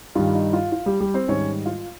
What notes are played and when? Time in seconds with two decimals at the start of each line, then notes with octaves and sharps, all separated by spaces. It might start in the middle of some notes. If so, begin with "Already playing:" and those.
0.15 G2 D#3 G3 F4
0.35 D#4
0.53 F4
0.72 F4
0.86 G3 G4
1.00 G3 G4
1.14 C4 C5
1.28 G#2 D#3 G3 C#4 C#5
1.66 F4 F5